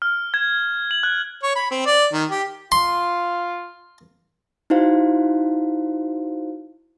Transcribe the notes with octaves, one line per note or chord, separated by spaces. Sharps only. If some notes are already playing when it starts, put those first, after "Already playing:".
F6
G#6
F#7
F#6
C#5
B5
C4
D5
D#3
G4
F4 C6
D#4 E4 F#4 C5 F5